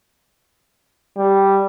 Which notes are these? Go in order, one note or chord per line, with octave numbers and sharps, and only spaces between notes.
G3